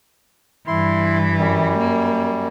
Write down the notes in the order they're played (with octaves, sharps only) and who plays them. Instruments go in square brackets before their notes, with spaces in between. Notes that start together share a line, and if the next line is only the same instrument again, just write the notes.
[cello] G2 E3 [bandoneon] E4 C6
[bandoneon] F#2 G3
[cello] A#3